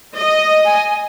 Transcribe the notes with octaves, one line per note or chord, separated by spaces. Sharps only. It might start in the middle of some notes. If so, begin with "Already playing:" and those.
D#5
G#5